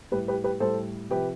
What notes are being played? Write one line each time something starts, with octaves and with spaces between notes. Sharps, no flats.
A2 G3 G4 B4
G4 B4
G4 B4
A2 G3 A4 C5
C3 F3 G4 B4